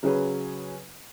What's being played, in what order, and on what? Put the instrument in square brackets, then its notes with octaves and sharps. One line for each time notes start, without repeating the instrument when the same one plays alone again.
[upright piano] C#3 F#3 C#4 G#4 B4